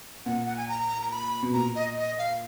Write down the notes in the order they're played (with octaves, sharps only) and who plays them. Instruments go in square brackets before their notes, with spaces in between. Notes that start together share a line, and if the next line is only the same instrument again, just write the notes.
[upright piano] A#2 [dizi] F#5
[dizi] F#5
G#5
A#5
A#5
B5
[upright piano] B2
[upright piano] A#2 [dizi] A#5
[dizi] D#5
D#5
F5